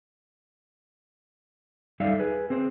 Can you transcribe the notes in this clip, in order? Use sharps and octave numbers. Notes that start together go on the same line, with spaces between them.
G3 D#4 A4 D5 E5 F5
G#4 B4
C4 G#4 C5